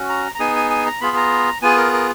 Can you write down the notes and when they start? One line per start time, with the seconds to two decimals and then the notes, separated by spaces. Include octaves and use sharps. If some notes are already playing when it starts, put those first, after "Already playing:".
Already playing: C#4 F#4
0.09 A#5
0.35 A#5
0.39 B3 D#4 G#4 G#5
0.56 G#5
0.70 G#5
0.86 A#5
1.01 B3 F4 G#4 B5
1.17 A#5
1.62 B3 F4 G#4 G#5
1.77 A#4
1.93 A#4